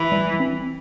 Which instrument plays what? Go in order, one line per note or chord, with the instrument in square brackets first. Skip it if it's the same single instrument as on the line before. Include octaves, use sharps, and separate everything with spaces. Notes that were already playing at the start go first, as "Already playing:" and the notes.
Already playing: [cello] E3
[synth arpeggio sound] G3
C4